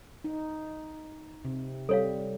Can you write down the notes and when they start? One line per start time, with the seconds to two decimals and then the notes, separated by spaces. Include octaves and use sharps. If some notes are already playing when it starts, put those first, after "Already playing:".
0.24 D#4
1.45 C3
1.89 G3 A4 C#5 F5